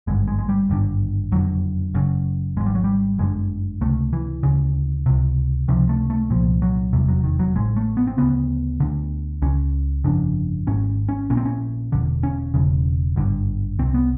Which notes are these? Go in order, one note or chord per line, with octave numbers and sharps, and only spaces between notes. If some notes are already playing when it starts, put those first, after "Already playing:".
G#1 G2 D3 G#3
G#3
G#3
G3
G#1 G2 D3
F#1 F2 D3 F#3
F#1 F#2 C#3
G#1 G#2 G#3
G3
F#3
G3
G1 F#2 D3 G#3
C#2 C3 A3
E3
D2 C#3
C#2 C3
C#2 C3 F3
A3
A3
C2 A#2 F3
F#3
F1 E2 C3 G3
F#3
D#3
F#3
A1 A2 G#3
A3
B3
C4
D2 C#3 B3
D2 D3
C#2 C#3 C#4
G1 F2 C#3 D4
G#1 G#2 C#4
C#4
A#1 A#2 C#4
C4
C#4
E1 D#2 D3
C#4
E1 E2 C#3
G#1 G2 D3
C2 C3 C4
B3